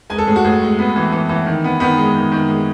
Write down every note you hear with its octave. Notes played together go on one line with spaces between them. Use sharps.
G#3 G#5
A4
A2 G#4
F#4
A2 G#4
G#3
B3
E3
E3
E3
D#3
B3
D#3 B3
G#3
D#3
D#3
G#3